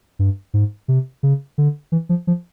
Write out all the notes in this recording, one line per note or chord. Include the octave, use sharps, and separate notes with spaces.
G2
G#2
C3
C#3
D3
E3
F3
F3